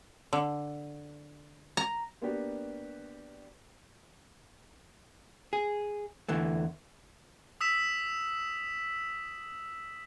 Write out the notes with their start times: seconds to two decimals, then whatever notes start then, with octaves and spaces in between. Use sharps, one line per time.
0.33 D3
1.77 A#5
2.22 A#3 B3 D4 F#4 G4
5.53 G#4
6.29 E2 D3 E3 A3
7.61 D#6 E6 B6 E7